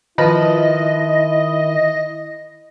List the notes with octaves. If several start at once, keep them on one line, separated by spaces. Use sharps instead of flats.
D#3 F3 E4 B4 D#5 B5